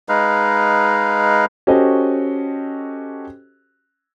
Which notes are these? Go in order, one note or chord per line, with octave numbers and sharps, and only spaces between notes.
G#3 D#4 B4 F5
C#4 F#4 G4 A4 C5 D#5